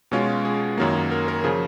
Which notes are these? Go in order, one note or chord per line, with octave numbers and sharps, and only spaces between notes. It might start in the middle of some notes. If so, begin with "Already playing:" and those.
B2 G#3 C#4 F4
G#4
F#2 D#3 F#3 A#3
A#4
A#4
C#3 F3 G#4